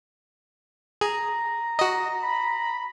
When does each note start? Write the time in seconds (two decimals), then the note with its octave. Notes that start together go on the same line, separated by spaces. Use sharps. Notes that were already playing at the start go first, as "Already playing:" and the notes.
1.01 G#4 A#5
1.79 F#4 D#5
2.23 B5